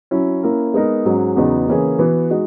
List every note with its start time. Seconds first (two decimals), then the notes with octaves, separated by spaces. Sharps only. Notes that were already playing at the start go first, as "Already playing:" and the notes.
0.11 F#3 C#4 E4
0.43 A#3 C#4 E4 A#4
0.74 G#3 B3 D#4 A#4
1.05 G#2 F#3 C#4 G#4
1.36 E2 C#3 F#3 B3 D#4
1.68 C#3 E3 A#3 C#4 G#4
1.99 E3 B3 F#4
2.30 G#3 D#4 F#4